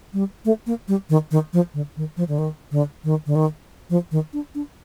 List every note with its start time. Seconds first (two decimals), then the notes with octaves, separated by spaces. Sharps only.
0.13 G3
0.45 A3
0.67 A#3
0.88 G3
1.10 D#3
1.31 D#3
1.53 F3
1.74 D3
1.97 D#3
2.17 F3
2.28 D3
2.38 D#3
2.71 D3
3.04 D#3
3.26 D3
3.35 D#3
3.90 F3
4.11 D#3
4.33 D4
4.55 D4